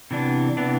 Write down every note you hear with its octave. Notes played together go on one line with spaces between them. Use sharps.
C3 E3 B3 D4
C3 E3 B3 D4